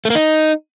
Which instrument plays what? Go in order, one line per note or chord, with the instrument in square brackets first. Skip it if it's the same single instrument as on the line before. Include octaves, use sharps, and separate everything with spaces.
[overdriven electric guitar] A3
A#3
D#4